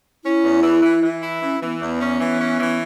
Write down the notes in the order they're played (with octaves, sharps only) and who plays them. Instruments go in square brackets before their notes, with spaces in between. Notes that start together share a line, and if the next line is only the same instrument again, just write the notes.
[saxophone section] C#4 [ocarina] E4
[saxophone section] E2
E3
E3
E3
E4
[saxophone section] E3 [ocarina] C#4
[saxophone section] E3 [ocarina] B3
[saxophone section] E2 [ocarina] B3
[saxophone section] C#4
E3
C#4
E3